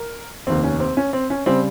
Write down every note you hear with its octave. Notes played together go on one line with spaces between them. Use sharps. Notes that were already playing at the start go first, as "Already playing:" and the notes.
Already playing: A#4
F1 D#2 D#3 C4
C#4
C4
C#4
C4
C#4
C#3 G3 C4